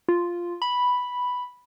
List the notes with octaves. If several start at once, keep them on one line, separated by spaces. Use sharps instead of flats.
F4
B5